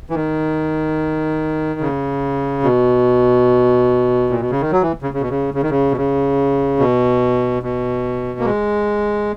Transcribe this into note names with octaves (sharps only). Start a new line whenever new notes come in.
E3
D#3
C#3
B2
A#2
B2
C#3
D#3
F#3
E3
C#3
C#3
B2
C#3
C#3
D#3
C#3
B2
C#3
B2
B2
A#3
G#3